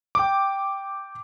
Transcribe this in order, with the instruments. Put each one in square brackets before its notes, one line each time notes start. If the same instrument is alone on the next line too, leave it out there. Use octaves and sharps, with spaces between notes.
[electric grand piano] G5 D6